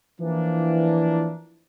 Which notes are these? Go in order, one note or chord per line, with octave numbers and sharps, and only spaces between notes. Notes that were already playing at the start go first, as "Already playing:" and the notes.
E3 F3 A#3 D4